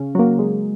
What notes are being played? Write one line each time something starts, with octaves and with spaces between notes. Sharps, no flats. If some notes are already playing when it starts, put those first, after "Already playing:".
Already playing: C#3
F#3 A#3
G#3